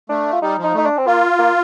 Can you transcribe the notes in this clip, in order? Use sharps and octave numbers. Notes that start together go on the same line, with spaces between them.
A3 D4
F4
G3 D#4
F3
D#4
A3 D#4
D4
C4
A#3 F4
A#3